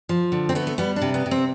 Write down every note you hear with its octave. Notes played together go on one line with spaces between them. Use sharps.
F3
D3
C4
A3 B3
A3
G3 B3
D4
C3
B3
C3
C4